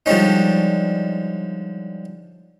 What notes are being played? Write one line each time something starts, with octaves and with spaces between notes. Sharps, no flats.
D3 F3 G3 G#3 C#4 D#4